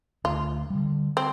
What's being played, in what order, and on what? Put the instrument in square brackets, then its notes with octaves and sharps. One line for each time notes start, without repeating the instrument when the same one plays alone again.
[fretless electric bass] D2 [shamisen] F4
[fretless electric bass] D3 G3
[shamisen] C4